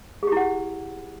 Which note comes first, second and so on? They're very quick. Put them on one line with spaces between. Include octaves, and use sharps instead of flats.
G#4 G4 E4 F#5